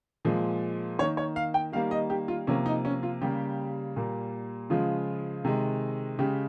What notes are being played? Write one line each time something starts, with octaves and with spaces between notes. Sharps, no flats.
A#2 F3 G#3
D#3 A#3 C#5
C#5
F5
G5
D#3 G3 A#3 F5
D#5
G4
F4
C3 F3 A#3 C#4
D#4
C#4
F4
C#3 G3 A#3 G4
A#2 G3 A#3
C#3 F3 G#3 F4
C3 D#3 G#3
C#3 G#3 G4